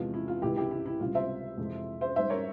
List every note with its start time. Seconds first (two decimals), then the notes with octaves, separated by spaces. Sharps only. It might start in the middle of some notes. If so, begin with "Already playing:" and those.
Already playing: E2 C3 F3 G#3 F4
0.14 E4
0.28 F4
0.42 C#2 C3 E3 G#3 E4 G4
0.56 E4 G4
0.71 E4
0.86 E4
1.00 C#2 C3 G3 F4
1.14 C5 E5
1.57 F2 C3 E3 G#3
2.01 C5 E5
2.16 G#2 G3 C5 E5
2.30 A#4 C#5